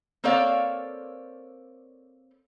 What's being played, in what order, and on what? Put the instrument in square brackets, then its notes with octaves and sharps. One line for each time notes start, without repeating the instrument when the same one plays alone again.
[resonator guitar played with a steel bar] A#3 C4 A4 C#5 D5 F5